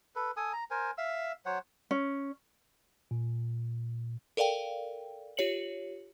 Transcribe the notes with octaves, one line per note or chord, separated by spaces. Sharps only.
A4 B4
A4 G#5 D#6
A#5
A#4 C5 G#5
E5 F5 E6
F#3 C5 C#5 F#5
C#4
A#2
A4 A#4 D5 F5 G5
F4 G4 C#5 C#7 F#7